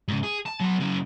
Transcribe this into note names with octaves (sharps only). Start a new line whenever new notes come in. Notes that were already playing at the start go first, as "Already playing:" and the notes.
G#2 C#3
G#4
A5
F#3 B3
F#2 C#3